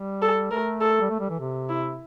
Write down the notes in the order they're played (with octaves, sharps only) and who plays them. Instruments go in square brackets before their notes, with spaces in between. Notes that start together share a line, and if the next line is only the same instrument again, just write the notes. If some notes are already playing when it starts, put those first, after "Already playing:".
Already playing: [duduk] G3
[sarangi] A4
[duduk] A3 [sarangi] A#4
[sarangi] A4
[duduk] G3
A3
G3
E3
C3
[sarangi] E4